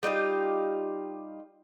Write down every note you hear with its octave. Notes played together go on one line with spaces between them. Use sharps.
G3 D#4 F4 G4